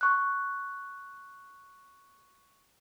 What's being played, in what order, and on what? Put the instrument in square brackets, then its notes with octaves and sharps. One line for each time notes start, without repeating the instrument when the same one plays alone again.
[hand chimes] C#6 F#6